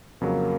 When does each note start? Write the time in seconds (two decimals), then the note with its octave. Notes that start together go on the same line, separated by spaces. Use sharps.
0.21 F2 C#3 F#3 A#3